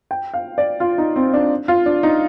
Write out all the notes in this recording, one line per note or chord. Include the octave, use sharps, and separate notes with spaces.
G5
F5
D5
F4
D#4
C4
D4
F4
D4
D#4